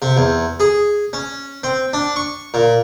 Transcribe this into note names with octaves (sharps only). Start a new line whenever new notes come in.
C3
E2
G#4
C#4
C4
D4
C#6
A#2